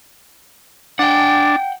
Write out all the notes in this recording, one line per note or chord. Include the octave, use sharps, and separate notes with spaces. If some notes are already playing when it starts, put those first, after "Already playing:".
D4 F#5 G5